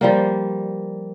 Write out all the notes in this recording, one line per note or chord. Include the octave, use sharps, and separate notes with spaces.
F3 G3 A#3